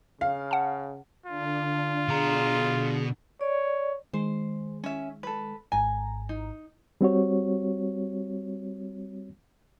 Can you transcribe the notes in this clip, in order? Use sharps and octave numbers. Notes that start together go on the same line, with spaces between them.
C#3 F5
F#5 A5
D3 D4 F4
B2 G#4 A#5
C#5 D5
D#3 G#3 C5
C#4 E5
A4 B4
G#1 G#2 G#5 A#5
D#4
G3 C4 F#4 C#5